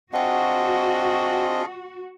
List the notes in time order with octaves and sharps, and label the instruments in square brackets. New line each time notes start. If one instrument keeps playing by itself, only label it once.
[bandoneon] C4 D#5 [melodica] D4 F4 G#4 [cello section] F#4 [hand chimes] F#5 G5